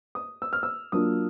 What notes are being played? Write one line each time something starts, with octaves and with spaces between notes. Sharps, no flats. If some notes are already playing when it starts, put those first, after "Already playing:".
D#6
E6
F6
E6
F#3 A#3 D4 F4 D#6